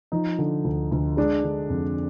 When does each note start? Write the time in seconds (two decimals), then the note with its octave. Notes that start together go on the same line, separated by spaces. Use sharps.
0.12 F3 D#4
0.39 D3
0.64 D2
0.92 D2
1.17 G#3 D4
1.44 D3
1.70 F2